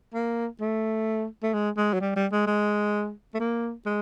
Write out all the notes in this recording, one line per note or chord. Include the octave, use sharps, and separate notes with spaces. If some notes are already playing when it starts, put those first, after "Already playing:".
A#3
A3
A3
G#3
G#3
F#3
G3
G3
G#3
G#3
A3
A#3
G#3